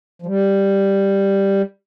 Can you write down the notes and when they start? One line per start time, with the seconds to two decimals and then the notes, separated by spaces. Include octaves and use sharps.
0.22 F3
0.26 G3